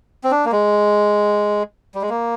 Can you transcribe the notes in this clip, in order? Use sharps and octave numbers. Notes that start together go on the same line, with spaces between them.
C4
D4
A#3
G#3
G3
G#3
A#3